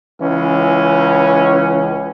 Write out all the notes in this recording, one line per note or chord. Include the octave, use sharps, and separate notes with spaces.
C#2 E3 C#4